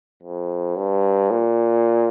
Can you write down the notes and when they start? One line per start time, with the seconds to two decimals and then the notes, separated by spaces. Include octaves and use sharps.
0.23 F2
0.77 G2
1.31 A#2